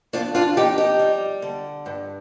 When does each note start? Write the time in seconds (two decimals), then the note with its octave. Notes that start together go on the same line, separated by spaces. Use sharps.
0.13 F2 D4 F4
0.35 D4 F4
0.57 F2 D#4 G4
0.78 D#4 G4
0.99 G3
1.42 D3
1.86 G2